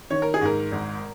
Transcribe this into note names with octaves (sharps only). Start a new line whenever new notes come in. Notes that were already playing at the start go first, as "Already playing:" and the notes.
D#3 C#5
A#4
G#4
G#2 A#4
G#1